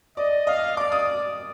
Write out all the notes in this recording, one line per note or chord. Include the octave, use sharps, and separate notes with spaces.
D5 D#5
D#5 F5
D5 D6
D#6